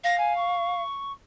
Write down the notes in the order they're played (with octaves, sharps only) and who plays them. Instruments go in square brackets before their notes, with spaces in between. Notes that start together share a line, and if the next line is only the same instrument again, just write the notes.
[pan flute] F5 [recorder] A#6
[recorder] G#5
C#6